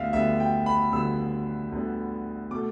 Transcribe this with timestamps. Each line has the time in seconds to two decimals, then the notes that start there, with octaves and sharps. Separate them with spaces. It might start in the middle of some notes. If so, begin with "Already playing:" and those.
Already playing: D2 D3 G3 B3 E5 F5
0.13 D2 D3 G3 B3 E5
0.40 G5
0.66 B5
0.92 D2 D3 G3 B3 E6
1.72 D2 D3 G3 B3
2.51 B2 A3 D6